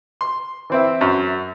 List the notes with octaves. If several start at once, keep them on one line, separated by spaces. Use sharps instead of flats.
C6
E3 C4 E4
F#2